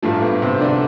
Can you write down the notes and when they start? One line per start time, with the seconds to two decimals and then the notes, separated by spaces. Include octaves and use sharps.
0.02 A1 G2 F3 A3
0.22 B3
0.42 C3 C4
0.61 D3 D4